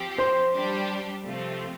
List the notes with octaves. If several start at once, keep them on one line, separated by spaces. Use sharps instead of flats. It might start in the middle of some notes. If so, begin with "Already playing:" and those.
Already playing: F3 C4 G4
C5
G3 D4 G4
C3 F3 A3 C4 F4